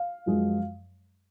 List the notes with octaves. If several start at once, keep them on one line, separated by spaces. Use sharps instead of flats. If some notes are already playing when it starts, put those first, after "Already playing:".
Already playing: F5
F#2 F3 G#3